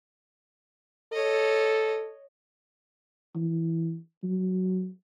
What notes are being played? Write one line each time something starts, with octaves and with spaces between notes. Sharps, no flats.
A4 C#5 D#5
E3
F#3